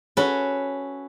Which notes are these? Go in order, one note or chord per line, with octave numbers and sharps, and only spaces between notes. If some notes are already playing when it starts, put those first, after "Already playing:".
C#4 F#4 A4 B4